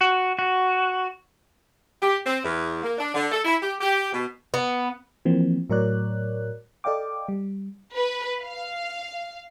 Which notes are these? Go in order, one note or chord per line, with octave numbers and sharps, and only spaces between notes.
F#4
F#4
G4
C4
E2
A#3
D4
D3
A4
E4
G4
G4
B2
B3
E3 F3 A#3 C4
A2 F#3 A#4 C#5 D5 F#6
A4 D5 D#5 F5 G5 D6
G3
B4
F5